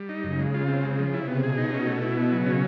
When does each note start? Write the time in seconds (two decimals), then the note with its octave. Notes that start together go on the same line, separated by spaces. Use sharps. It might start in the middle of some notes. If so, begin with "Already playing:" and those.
Already playing: G3
0.09 D#4
0.23 F#2 C#3
0.39 G#3
0.54 F4
0.68 C4
0.84 G#3
0.98 F3
1.13 C3 E4
1.28 B3
1.43 B2 G#4
1.58 D#4
1.72 B2 C#4
1.87 A3
2.02 E4
2.17 B3
2.32 C#3 F#3
2.46 C#4